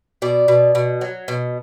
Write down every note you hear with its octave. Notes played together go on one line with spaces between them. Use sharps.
B2 D5
B2
B2
F#3
B2